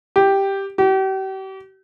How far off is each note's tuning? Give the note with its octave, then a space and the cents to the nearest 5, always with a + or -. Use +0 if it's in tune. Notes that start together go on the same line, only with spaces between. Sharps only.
G4 +0
G4 -40